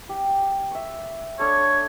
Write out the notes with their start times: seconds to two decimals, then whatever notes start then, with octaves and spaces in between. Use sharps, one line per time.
0.09 G4
0.71 E5 C#6
1.39 D4 A4 C#5